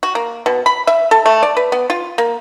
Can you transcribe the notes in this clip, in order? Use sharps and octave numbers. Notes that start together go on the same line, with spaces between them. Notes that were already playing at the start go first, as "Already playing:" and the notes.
F#4
A#3
B2
B5
E5
A4
A3
D5
B4
B3
F4
A#3